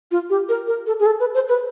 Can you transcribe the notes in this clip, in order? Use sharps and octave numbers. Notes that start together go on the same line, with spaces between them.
F4
G4
A#4
A#4
A4
G#4
A4
B4
C5
B4